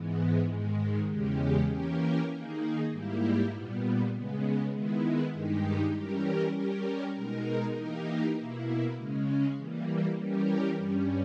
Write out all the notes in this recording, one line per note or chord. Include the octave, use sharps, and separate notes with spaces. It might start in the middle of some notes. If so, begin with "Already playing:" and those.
Already playing: G#2 E3 G#3 B3
G#2 D#3 G#3
E2 C#3 G#3 C#4 G4
E3 A#3 C#4 G4 A#4
D#3 A#3 D#4 G#4
G#2 G3 A#3 E4 G4
A#2 G3 B3
C#3 G#3 B3
D#3 G#3 B3 E4
G2 D#3 G#3 D#4 G4
E3 G3 C#4 G4 A#4
G3 C#4 G4 A#4
B2 G#3 D#4 A#4
E3 A#3 D#4 G4 A#4
B2 A#3 E4
C#3 G#3 C#4
E3 G3 A#3
E3 G3 C#4 G4 A#4
G2 G3 C#4